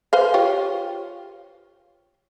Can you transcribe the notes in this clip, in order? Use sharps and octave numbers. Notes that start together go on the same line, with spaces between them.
B4 C5 F5
F4 G4 C#5